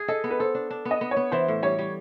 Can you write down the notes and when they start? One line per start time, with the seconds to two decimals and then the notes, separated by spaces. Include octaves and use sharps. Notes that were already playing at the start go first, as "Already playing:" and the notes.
Already playing: G#4
0.08 A4 D#5
0.24 B3
0.31 B4
0.39 A4 C5
0.55 D4
0.71 D4
0.85 B3
0.91 D#5
1.01 B3
1.11 C#5
1.17 B3
1.32 E3 C5
1.48 A2
1.63 G3 C#5
1.78 G3